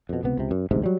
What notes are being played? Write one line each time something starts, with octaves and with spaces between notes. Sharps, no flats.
F2 B2
C#2 C3 B3
C#2 C3
F#2
A1 D2 G#2 C3
F#3 G3